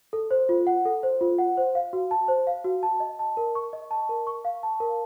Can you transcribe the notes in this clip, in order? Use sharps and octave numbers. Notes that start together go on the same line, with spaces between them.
A4
C5
F4
F#5
A4
C5
F4
F#5
C5
F5
F#4
A5
C5
F5
F#4
A5
D#5
A5
A#4
C#6
D#5
A5
A#4
C#6
F5
A5
A#4